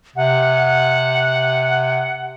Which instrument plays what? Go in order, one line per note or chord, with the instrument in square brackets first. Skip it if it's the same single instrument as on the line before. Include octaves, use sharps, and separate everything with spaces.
[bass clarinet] C3 [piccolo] F#5